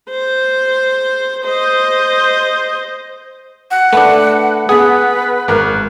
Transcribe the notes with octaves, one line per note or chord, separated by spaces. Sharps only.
C5
C5 D#5
F#5
A3 D4 B4
B3 G#4 B4 F#5
G#1 A#4 F#6